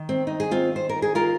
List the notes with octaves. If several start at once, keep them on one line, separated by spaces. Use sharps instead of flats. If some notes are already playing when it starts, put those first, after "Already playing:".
Already playing: D#3
C4
D#4
G#4
C4 F4
C5
A#4
G#4
F4 A#4